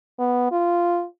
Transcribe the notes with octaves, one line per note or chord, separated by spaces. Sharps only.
B3
F4